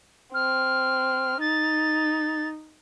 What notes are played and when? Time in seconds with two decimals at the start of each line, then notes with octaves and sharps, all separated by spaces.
0.34 C4 F6
1.40 D#4 A6